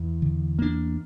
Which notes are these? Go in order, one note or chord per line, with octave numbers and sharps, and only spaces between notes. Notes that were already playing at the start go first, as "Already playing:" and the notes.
Already playing: E2
D3
A#3 D4